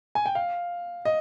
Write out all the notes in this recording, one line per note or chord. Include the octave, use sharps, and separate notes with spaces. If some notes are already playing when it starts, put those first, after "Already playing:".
G#5
G5
F5
D#5